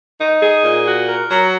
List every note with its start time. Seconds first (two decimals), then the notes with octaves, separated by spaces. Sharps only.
0.19 D#4
0.41 G#4
0.64 A#2
0.86 F#4
1.07 A#4
1.30 F#3